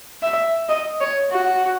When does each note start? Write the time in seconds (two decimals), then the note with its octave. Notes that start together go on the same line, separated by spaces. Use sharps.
0.23 E5
0.69 D#5
1.00 C#5
1.31 F#4